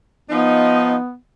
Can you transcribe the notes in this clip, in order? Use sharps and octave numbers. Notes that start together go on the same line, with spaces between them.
F3 B3 D#4